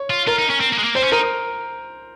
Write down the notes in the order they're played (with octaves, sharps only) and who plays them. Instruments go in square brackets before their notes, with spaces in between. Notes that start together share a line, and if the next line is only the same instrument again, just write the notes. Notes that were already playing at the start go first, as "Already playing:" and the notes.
Already playing: [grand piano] C#5
[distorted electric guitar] F4
[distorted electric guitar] F4 [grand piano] A#4
[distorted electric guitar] D#4
C#4
C4
A#3
G#3
A#3
[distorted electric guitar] C4 [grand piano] C5
[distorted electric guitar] C#4
[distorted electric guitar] D#4 [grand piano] A#4